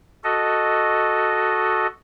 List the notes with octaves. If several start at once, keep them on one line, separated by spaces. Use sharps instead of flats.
F#4 A4 D#5